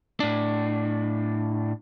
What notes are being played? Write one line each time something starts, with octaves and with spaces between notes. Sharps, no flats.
A2 D4